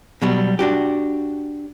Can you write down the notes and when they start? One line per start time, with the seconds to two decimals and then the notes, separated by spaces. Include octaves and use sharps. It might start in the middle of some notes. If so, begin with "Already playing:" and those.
0.22 B2 F#3 G3
0.59 D4 F#4 G4